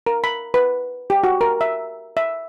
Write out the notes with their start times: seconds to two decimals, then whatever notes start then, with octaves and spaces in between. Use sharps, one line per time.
0.06 A#4
0.24 B5
0.54 B4
1.10 G4
1.24 F#4
1.41 A#4
1.61 E5
2.17 E5